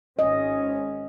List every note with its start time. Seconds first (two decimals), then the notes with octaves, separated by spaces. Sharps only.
0.19 G#1 C#4 D#5